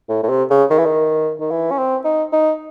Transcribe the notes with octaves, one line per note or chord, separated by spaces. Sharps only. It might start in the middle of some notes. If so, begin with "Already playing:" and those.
A2
A2
C3
C#3
D#3
E3
D#3
D#3
E3
C#4
C4
D#4
D#4